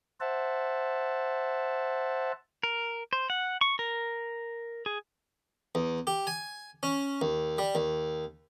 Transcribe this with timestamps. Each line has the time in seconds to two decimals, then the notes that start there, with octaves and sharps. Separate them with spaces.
0.20 C5 E5 F#5 A5
2.63 A#4
3.13 C5
3.30 F#5
3.61 C#6
3.79 A#4
4.86 G#4
5.75 E2
6.07 G4
6.27 G#5
6.83 C#4
7.21 D#2
7.58 G3
7.75 D#2